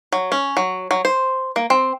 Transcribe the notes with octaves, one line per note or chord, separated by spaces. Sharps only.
F#3
C#4
F#3
F#3
C5
A#3
C4